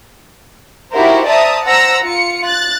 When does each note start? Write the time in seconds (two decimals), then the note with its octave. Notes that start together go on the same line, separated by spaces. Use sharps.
0.93 D#4 E4 F#4 G4 A#4 C5
1.27 C5 D5 E5 A5 A#5 D#6
1.65 C5 F#5 A#5 E6 A#6
2.04 F4 C#7
2.44 F#6 A6